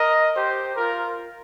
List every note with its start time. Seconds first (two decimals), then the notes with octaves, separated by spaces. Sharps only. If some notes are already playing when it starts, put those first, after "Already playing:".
Already playing: A#4 D#5
0.34 G4 C5
0.76 F4 A#4